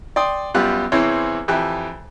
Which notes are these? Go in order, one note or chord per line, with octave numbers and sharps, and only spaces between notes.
D5 G5 C6 D#6
F#2 G3 B3 F4 G4 F#6
E2 E3 C4 C5 C#5
F2 E3 G4 E5 G5 F#6